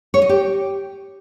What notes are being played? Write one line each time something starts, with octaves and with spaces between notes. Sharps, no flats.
C#5
D#5
G4